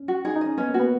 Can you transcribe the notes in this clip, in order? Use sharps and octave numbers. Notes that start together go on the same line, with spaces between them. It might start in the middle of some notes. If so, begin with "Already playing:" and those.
Already playing: C#4
F#4
D#4 G#4
D#4
C#4 D#5
B3 C#4
A#3
F#4
B3